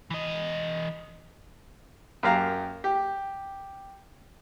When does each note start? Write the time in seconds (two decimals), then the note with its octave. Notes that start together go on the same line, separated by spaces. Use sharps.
0.10 E3 D#5
2.23 F#2 A#3 G4 F5 A#5
2.84 G4